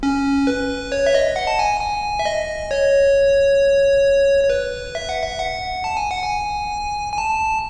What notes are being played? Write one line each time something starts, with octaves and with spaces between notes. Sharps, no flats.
C#4
B4
C#5
E5
D#5
F#5
A5
G#5
G#5
E5
D#5
C#5
C#5
B4
E5
F#5
E5
F#5
A5
G#5
F#5
G#5
G#5
A5